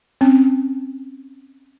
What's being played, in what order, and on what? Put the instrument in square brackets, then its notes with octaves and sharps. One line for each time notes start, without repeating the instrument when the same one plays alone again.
[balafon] C4 C#4